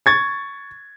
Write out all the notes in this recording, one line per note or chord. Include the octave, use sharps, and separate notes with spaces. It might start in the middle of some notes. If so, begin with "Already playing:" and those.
C#6 G#6 A6